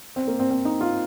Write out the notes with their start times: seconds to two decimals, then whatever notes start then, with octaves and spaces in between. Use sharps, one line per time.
0.16 C4
0.28 A#3
0.39 C4
0.51 C4
0.65 D#4
0.81 F4